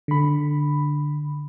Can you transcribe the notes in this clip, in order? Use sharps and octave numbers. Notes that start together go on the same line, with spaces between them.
D3 B5